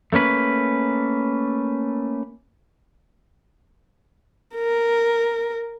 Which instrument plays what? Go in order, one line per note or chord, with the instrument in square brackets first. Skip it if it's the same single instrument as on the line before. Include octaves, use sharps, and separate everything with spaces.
[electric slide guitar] A3 A#3 C#4 B4
[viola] A#4